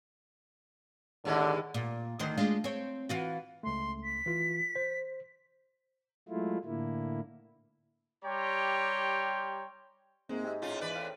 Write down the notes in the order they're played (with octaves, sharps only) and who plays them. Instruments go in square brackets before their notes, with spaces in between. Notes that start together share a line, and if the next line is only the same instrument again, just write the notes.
[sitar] D#2 A2 G#3 [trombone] D3
[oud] A#2
D2 D#3 C5
G#3 D4 F4
C4 C#5
E3 F4 F#4
[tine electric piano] C#2 A3 [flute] C6
[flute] B6
[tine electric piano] E3 F4
C5
[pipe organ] F#3 G#3 A3 E4 F4
A2 D3 A#3 E4
[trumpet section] G3 G4 C#5 G5 A#5 C6
[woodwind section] G#2 [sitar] G#3 [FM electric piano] A#3 C4
[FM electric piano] G4 D#5 E5
[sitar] A2 C#4 F4 [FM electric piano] G#4
[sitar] E2 B4 D5
[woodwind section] A2 C4 [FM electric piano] F5